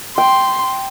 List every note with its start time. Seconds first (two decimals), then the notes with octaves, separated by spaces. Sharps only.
0.18 G5 C6